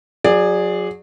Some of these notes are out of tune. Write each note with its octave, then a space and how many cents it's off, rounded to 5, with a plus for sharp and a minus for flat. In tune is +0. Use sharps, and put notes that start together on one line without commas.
F#3 -30 G#4 -10 D5 +15